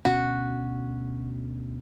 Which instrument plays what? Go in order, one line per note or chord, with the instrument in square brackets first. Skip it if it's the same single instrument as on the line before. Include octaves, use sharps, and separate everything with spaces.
[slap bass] D2 B2 C#4 [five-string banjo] F#4